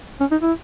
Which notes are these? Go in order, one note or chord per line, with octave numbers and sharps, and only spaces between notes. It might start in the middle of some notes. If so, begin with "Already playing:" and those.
C#4
D#4
E4